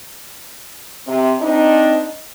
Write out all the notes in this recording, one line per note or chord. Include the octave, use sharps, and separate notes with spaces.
C3
C4 D4 D#4